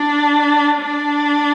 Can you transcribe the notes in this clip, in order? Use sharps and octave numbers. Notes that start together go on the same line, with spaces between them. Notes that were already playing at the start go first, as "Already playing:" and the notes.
Already playing: D4
D4